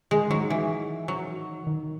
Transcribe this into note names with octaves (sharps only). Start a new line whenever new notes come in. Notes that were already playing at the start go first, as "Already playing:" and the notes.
D#3 G#3
D#3 F#3
E3
F#3
D#3